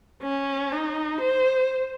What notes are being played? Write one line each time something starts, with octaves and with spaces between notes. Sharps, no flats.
C#4
D#4
C5